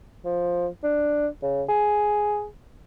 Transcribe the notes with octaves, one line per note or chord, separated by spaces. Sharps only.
F3
D4
C#3
G#4